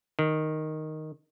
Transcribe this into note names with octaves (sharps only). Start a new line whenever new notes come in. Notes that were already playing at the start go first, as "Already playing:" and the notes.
D#3